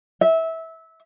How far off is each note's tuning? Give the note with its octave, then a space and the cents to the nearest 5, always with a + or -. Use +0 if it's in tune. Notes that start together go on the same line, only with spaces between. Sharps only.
E5 -20